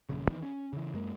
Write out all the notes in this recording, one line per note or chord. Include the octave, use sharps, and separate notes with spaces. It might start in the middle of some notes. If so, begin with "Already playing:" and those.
D#1 A#1 F#2 C#3
E2 D#3 E3
C#4
C#3 E3
F#2 G#3 A#3